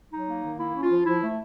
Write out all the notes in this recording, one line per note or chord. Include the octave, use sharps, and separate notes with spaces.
F#3 D#4
A#3
D#3
A#3 E4
C#4
F4
F3
F3 E4
A3